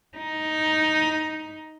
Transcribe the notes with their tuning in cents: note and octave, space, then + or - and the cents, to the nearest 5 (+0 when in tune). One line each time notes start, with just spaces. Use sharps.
D#4 +5